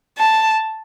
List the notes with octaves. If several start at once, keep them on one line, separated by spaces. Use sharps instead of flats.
A5